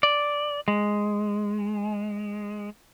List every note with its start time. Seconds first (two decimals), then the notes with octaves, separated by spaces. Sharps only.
0.03 D5
0.68 G#3